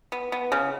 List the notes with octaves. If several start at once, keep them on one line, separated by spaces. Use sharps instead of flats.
B3
B3
C#3